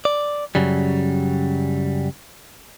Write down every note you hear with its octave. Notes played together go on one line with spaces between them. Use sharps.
D5
F#2 C#3 F#3 G3